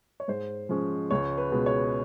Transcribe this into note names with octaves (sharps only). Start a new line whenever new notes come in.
C#5
G#2 C5
F3 G#3 C#4
C#2 C#5
B4
B2 G#3
C#5